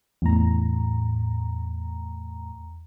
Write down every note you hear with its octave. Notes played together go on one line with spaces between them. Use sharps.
E2 A2 A#5